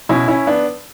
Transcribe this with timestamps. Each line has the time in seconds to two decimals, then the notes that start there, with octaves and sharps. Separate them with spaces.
0.09 B2 C#4 E4
0.28 C#4 E4
0.47 B3 D4